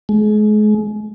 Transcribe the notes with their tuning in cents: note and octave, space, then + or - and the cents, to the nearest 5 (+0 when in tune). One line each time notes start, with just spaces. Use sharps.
G#3 +35